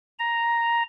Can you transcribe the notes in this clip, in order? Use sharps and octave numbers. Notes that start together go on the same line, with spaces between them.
A#5